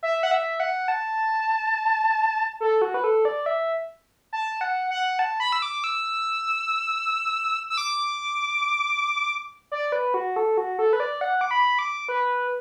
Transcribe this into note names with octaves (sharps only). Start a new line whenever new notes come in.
E5
F#5
E5
F#5
A5
A4
F#4
B4
A4
D5
E5
A5
F#5
F#5
A5
B5
E6
D6
E6
E6
D6
D5
B4
F#4
A4
F#4
A4
B4
D5
F#5
D6
B5
D6
B4